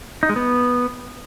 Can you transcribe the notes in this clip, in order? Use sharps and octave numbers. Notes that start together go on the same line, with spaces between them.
D#4
G#3
B3